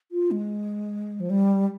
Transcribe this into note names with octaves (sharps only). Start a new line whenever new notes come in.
F4
G#3
F3
G3